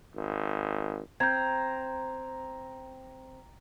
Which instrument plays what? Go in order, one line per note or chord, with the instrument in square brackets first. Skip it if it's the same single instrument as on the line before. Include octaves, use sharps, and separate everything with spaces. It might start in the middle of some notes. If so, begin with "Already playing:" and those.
[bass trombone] G#1
[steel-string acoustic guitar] C4 [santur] A#5 [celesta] G6 G#6